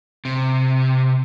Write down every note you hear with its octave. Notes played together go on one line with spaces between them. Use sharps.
C3